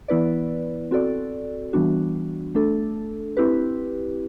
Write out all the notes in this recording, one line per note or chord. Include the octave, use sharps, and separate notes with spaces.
E3 B3 E4 B4 D5
C4 F#4 A4 D5
E3 G3 B3 D4 F#4
A3 D4 A4
C4 E4 G4 B4